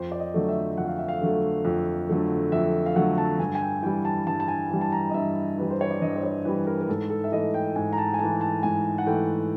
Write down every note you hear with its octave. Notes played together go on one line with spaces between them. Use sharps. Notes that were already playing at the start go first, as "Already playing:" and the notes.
Already playing: F2 C5
D5
D#5
D3 F#3 A3
E5
F2 F#5
F5
E5
F5
D3 F#3 A3
F2
D3 F#3 A3
F2 E5
F5
D3 F#3 A3 F#5
A5
G2 G#5
G#5
G5
E3 G3 G5
A5
G2 A5
A5
G#5
E3 G3
A5
A#5
D#5
G2 E5
E3 G3 B4
C5
C#5
D5
G2 D#5
C5
C#5
E3 G3 B4
A#4
A#4
G#2 A4
A4
E5
E3 A3 D#5
G5
G#2 G#5
A#5
A5
G#5
E3 A3 A5
A5
G#2 G#5
F#5
E3 A3 G5